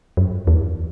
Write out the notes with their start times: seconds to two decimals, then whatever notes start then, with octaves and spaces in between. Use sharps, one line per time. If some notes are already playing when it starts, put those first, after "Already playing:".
0.17 F#2
0.47 E2